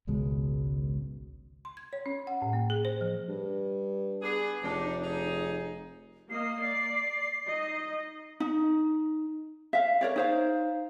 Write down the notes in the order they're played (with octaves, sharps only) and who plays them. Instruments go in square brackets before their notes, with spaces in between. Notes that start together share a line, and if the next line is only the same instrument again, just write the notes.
[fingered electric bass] G#1 C#2 B2 G#3
[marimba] C6
G#6
C#5
C#4
F#5
A2
A#3
G#4
C5
F3
[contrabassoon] G2
[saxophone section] B3 D4 G#4
[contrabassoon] F1 [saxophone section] D4 D#4
[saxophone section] D#4 G#4
[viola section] A#3 D#5 [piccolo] C7
[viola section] D5
D#4 D#5
[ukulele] D#4
E5 F5
A#4 C#5 D5
D#4 C5 F5